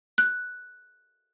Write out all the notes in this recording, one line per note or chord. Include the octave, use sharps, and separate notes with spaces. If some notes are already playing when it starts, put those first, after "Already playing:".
F#6